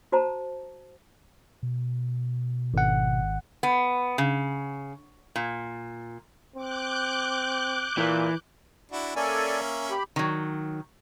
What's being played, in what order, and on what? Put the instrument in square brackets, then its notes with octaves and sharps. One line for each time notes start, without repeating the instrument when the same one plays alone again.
[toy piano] F#4 C5 A5 A#5
[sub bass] B2
[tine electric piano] G#1 F#5
[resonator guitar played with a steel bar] B3
C#3
A#2
[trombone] C4 [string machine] D6 F#6 G6
[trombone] A#2 [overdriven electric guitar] E3
[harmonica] D4 E4 F#4
[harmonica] A#3 C#4 E5 [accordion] A4 D5 G#5
[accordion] G4 B5
[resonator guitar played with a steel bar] D#3 F#3